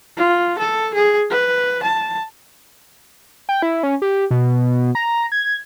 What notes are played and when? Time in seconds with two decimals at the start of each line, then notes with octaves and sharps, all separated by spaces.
0.17 F4
0.58 A4
0.94 G#4
1.30 B4
1.83 A5
3.49 G5
3.62 E4
3.83 C#4
4.02 G4
4.31 B2
4.95 A#5
5.32 G#6